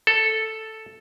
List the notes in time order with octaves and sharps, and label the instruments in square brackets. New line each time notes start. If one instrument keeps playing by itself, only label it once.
[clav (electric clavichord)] A4